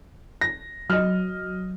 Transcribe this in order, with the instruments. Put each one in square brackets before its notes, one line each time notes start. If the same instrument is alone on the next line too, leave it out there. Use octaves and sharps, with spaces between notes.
[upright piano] A#6
[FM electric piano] F#3 [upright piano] D#5 F6